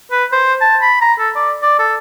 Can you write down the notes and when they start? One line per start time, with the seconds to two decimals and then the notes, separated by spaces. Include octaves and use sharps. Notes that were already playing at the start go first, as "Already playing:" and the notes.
0.12 B4
0.32 C5
0.61 A5
0.82 B5
1.01 A#5
1.19 A4
1.36 D5
1.62 D5
1.79 A4